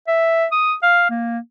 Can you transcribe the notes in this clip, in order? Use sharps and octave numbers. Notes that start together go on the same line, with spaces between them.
E5
D#6
F5
A#3